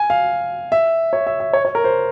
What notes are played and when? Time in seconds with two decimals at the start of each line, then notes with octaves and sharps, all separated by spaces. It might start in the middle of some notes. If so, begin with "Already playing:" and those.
Already playing: G#5
0.10 F5
0.72 E5
1.13 C#5
1.27 E5
1.40 E5
1.53 C#5
1.65 C#5
1.75 A#4
1.84 C5